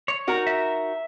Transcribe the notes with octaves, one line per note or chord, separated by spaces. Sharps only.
C#5
D#4 F#4 A#4
E5